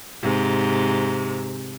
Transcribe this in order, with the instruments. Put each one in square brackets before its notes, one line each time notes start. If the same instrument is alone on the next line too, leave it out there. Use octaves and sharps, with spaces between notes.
[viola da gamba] G#2 C3